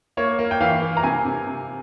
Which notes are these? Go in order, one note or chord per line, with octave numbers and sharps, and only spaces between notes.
A#3 C#5
A#3
G5
E3 F5
A#3
A#5
C3 G#5
C3
C3